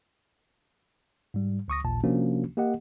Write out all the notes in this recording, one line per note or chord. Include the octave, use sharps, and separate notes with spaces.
G#2 G3
D2 C#6 D#6 A#6
A1 D#2 A#2 A5
C3 F3 A#3 C#4 D4 F#4
A#3 G4 D#5 F#5